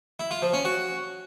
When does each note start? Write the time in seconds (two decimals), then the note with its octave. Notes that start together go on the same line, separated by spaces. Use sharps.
0.19 E4
0.31 F4
0.42 F3
0.53 C#4
0.65 F#4